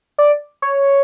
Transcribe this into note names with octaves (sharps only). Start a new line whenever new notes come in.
D5
C#5